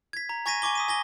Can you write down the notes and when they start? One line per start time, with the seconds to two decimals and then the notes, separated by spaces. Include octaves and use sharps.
0.13 G#6 B6
0.29 A#5
0.46 G#5 C#6 G#6 A#6 B6 D#7
0.62 G#5 C#6 D6 G7
0.75 D#6 B6 D#7
0.88 G#5 A#6 G7